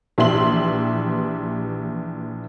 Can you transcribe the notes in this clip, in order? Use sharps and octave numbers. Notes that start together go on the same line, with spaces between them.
A#1 E3 G4 E5 C6 F#7